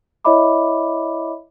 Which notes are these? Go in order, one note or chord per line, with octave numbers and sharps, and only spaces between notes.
E4 C#5 D#5 E5 B5 D6